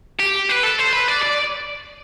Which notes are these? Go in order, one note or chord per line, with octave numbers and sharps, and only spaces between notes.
G4
B4
A4
C5
B4
D5
D5